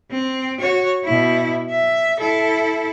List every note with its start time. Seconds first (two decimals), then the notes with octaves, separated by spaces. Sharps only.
0.11 C4
0.60 F#4 C#5
1.05 B2 E4
1.70 E5
2.19 E4 A4